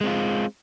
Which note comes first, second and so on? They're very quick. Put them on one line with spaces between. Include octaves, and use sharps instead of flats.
G#3 C4 F4